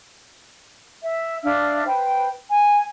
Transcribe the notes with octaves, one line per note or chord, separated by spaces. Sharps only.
E5
D4 E5 F5 F6
B4 C5 G5
G#5